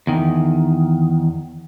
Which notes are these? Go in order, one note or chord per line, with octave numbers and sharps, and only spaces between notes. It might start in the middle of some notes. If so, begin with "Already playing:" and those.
E2 D#3